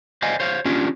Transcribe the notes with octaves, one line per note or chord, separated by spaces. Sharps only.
C5 D5 D#5 F5 G#5
C5 C#5 F5
C#4 D4 F4 G4